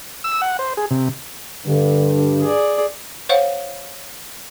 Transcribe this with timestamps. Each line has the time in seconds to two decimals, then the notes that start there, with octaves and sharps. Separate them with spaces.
0.24 E6
0.42 F#5
0.59 C5
0.77 G#4
0.91 C3
1.66 G2 D3
2.42 G#4 D5
3.29 C5 C#5 F5 F#5